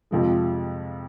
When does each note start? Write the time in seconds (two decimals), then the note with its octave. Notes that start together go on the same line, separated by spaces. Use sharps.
0.11 F2 C3 F3 G#3